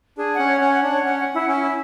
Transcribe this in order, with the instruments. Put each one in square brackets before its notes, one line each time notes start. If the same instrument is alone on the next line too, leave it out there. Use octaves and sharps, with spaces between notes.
[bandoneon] D4 [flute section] G#4
[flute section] F#5
[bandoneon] C#4
[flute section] C#5
[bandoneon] C#4 [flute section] F#5
[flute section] F#5
[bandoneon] D4
[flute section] C#5
[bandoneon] C#4 [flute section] F#5
[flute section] F#5
E4
[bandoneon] C#4 [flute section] E4
[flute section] E4